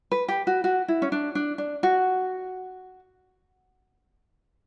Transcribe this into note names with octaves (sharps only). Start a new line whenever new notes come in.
B4
G4
F#4
F#4
E4
C#4
D4
D4
D4
F#4